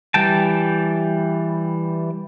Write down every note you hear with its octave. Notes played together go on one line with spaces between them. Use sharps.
E3 G3 G5 A5